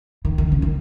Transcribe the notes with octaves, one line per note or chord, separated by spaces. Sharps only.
D#3
D#3
C#3
D#3